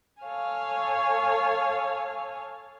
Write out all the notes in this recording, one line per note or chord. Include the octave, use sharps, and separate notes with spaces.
A4 C#5 F5 G#5